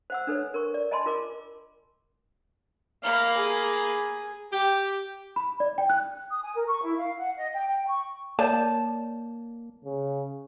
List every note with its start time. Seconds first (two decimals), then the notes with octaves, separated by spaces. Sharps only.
0.10 C5 F#5 E6
0.27 D4 A4 B4 C#5
0.54 A#4 C#6
0.74 D5
0.91 D#5 G#5 A5 B5 C6
1.06 F4 A#4 D6
3.04 A#3 F5 B5
3.38 G#4
4.52 G4
5.36 B5
5.60 D5
5.78 G5
5.90 F#6
6.30 D#6
6.42 G#5
6.55 A#4
6.67 C#6
6.82 E4
6.97 F5
7.17 F#5
7.36 D#5
7.53 G5
7.67 G5
7.87 C#6
8.39 A#3 C#5 D5 A5 D6
9.85 C#3